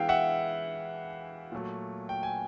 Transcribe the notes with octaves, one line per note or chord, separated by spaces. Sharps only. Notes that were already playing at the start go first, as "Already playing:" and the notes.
Already playing: E3 G#3 B3 E4 F5 G5
E5 F#5
A#2 F#3 A3
G5
G#5